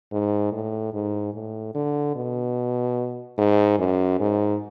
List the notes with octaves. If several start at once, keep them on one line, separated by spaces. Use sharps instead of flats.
G#2
A2
G#2
A2
D3
B2
G#2
F#2
G#2